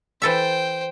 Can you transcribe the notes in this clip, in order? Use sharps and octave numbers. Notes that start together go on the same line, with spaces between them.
E3 A4 C5 E5 G5